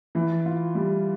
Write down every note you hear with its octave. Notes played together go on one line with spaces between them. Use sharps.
E3
F4
G3